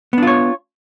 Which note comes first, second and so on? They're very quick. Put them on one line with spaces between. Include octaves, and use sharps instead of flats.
B3 D4 F4 C#5